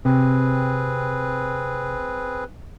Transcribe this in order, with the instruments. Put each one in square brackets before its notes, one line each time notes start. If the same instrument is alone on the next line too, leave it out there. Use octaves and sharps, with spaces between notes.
[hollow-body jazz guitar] C3 [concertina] C4 G#4 B4